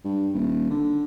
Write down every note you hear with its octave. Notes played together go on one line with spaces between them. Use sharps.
G2
D#1
D3